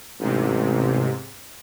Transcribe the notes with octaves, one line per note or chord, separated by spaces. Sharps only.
A1 G#2 C3